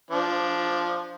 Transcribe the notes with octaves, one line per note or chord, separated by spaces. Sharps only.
F3 D4